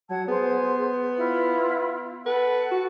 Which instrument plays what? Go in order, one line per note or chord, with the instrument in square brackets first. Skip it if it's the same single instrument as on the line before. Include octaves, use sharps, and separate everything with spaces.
[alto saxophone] F#3 [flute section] F#5 A5 G#6
[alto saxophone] B3 [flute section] G#4 C5
[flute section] E4 F4 F5
[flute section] A4 F#5 [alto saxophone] B4
[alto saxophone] F#4